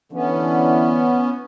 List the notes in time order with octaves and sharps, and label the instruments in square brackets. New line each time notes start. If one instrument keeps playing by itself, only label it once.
[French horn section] D3 E3 [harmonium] B3 C#4